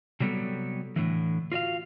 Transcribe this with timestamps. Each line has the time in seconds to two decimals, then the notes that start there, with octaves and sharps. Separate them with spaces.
0.20 C3 F#3 G3 B3 A4
0.96 A2 D3 E3
1.52 F4 F#4 D5 F5